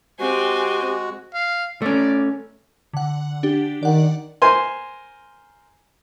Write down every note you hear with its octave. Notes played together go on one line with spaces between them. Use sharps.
G#3 C4 F#4 G4 G#5
F5
A3 C#4 D5
D3 F#5
D4 G4
D#3 D5 F#5
A#4 C5 G#5 C6